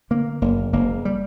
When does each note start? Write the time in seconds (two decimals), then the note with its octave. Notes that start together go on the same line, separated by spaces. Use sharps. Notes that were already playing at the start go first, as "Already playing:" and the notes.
0.11 D3 A#3
0.42 F#1 A#3
0.73 F#1 A#3
1.05 G3